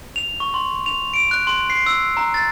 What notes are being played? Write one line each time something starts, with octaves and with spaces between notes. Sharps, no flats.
F7
C#6
C6
F7
D7
F#6
C6
C7
E6
A#5
A6